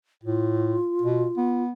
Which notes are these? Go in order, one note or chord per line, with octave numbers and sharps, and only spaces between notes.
A2 F4
B2
B3